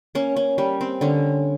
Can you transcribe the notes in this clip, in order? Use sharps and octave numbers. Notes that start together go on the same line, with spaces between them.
A#3 C#4
C#4
G3 C#4
C4
D3 C#4